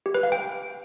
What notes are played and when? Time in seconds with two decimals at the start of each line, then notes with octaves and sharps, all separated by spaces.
0.06 G4
0.14 B4
0.23 F5
0.32 G5